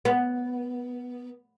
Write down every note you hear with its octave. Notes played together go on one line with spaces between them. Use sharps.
B3